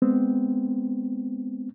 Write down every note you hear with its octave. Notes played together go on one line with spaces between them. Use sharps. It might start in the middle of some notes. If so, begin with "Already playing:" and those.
G#3 B3 C4